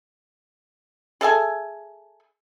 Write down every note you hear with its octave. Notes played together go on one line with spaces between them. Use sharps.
G#4 A4 E5 G#5